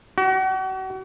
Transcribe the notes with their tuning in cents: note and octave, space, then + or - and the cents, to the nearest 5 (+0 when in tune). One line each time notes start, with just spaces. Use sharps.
F#4 +40